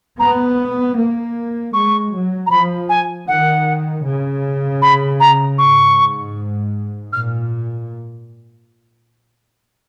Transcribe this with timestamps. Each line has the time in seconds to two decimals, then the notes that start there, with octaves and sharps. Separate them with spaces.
0.18 B3 A#5
0.96 A#3
1.73 G#3 C#6
2.12 F#3
2.46 A#5
2.50 F3 B5
2.89 G#5
3.27 D#3 F#5
4.04 C#3
4.82 B5
5.20 A#5
5.58 G#2 C#6
7.12 A#2 F6